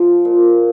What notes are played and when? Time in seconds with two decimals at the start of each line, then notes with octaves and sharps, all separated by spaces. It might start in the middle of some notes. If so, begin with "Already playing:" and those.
Already playing: F3 C5
0.25 A#2